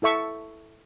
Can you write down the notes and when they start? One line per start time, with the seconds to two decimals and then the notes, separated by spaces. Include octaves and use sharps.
0.02 E4 A4 E5 C#6